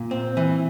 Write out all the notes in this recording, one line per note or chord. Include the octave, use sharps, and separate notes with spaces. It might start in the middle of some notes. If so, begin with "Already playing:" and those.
Already playing: A#2
C4
E3